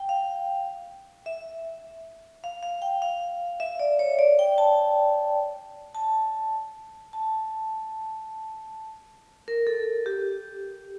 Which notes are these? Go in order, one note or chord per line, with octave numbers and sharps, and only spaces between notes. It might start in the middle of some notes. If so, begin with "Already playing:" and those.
Already playing: G5
F5
E5
F5
F5
G5
F5
E5
D5
C#5
D5
G5
A5
A5
A5
A#4
A4
G4